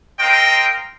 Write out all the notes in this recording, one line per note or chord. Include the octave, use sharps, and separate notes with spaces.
C4 A#4 D#5 F5 G5